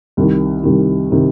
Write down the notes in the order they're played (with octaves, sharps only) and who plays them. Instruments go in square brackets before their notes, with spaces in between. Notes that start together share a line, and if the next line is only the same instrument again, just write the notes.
[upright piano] C2 C3 D#3
C2 C3 D#3
C3 D#3